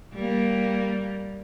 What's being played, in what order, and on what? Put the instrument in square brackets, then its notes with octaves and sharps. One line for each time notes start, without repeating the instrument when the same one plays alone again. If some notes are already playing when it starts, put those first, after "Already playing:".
[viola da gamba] G3 A#3